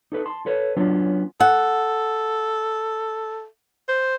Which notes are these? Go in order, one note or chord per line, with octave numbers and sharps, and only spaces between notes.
D#4 A4 B4
A5 C6
A4 B4 C#5
F#3 B3 C#4 D4 F4
A4 F#5
C5